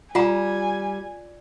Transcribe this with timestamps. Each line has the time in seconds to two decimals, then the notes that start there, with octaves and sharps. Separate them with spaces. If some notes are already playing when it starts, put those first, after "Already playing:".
0.15 G3 F4 F#5 G#5 A#5